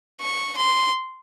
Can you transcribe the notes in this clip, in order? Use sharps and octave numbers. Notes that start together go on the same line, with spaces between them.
C#6
C6